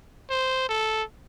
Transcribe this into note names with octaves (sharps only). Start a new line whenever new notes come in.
C5
A4